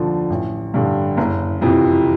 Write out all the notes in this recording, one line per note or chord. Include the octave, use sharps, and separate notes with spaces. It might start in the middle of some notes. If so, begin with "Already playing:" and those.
Already playing: D#2 D3 F3
A1
G2 D3
F#1
F2 C3 E3